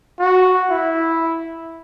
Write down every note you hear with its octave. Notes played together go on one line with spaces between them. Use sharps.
F#4
E4